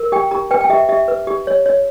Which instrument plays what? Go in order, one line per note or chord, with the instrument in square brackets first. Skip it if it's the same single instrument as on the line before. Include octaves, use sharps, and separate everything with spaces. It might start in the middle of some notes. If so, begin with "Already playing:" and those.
Already playing: [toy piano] A#4
G4 G5
G4 A#5
B4 G5
G5
G4 E5
G4 E5
B4
G4
C#5
C#5